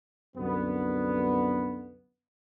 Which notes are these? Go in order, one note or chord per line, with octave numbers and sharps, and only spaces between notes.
C2 F#2 D3 B3